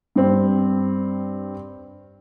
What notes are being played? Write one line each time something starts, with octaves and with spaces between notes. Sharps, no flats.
G2 C4